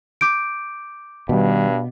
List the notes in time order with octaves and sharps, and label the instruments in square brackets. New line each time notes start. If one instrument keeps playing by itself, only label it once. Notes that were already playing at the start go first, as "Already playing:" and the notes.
[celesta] D6 G6 D7
[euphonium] G2 [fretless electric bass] B2 [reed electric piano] D#3 G3